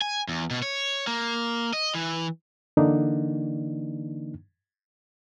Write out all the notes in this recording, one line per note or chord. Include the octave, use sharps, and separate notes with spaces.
G#5
E2
B2
C#5
A#3
D#5
E3
D3 E3 A#3 D4 D#4